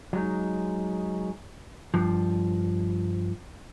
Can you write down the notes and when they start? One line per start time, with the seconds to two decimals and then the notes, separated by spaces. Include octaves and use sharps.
0.13 F#3 G#3 D#4
1.94 G2 F3